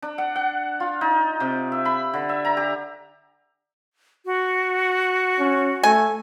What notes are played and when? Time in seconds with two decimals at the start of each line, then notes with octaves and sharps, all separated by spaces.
0.02 D4
0.18 F#5
0.36 F#5
0.80 F4
1.01 D#4
1.40 C3
1.72 E5
1.85 B5
2.13 D3
2.29 E5
2.45 A#5
2.57 G4
4.26 F#4
5.39 C#4
5.83 A3 G#5